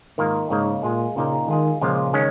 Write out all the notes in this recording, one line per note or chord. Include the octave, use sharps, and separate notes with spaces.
G#2 D#3 A#3 F4 A#4
G#2 C#3 A#3 D#4 A#4
A#2 G#3 F4 G#4
A#2 C#3 A#3 D#4 A#4
D#3 G#3 F4 G#4
A#2 C#3 F3 G#3 F4
D#3 G#3 C#4